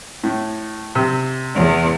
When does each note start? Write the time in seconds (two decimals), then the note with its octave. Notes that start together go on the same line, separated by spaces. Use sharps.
0.24 A2
0.95 C3
1.55 E2